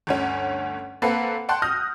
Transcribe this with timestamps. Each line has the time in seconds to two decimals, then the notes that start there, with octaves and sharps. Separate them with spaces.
0.07 G1 D2 C#4
1.02 A#3 C4 A4 B4 F#5
1.49 F#5 G5 A5 C6 F#6
1.62 D#6 F6 G6 A#6